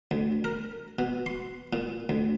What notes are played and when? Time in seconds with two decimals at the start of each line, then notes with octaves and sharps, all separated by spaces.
0.11 D2
0.44 A#4
0.99 B2
1.26 C6
1.73 A#2
2.09 D2